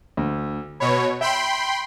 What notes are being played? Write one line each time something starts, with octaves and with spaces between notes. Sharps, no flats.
D2
B2 C#5 B5
E5 G5 B5 C6